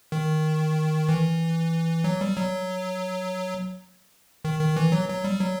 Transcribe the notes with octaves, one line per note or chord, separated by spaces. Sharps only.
D#3
E3
F#3
G3
F#3
D#3
D#3
E3
F#3
F#3
G3
F#3